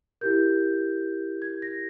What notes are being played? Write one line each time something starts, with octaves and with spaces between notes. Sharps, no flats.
E4 G4 A#4 G6
G#6
A#6